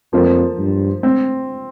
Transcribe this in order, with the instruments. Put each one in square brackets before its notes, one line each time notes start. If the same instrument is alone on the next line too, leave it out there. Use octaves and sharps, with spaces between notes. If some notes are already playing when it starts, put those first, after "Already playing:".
[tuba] F2 [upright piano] F3 A#3 F4 C5
[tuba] G2
[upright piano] C4